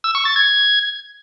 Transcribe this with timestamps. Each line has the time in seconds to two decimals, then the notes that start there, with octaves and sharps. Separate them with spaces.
0.04 E6
0.15 C#6
0.25 A6
0.36 G#6